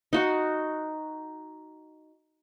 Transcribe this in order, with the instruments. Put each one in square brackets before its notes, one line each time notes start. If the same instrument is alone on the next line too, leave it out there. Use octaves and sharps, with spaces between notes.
[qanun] D#4 F#4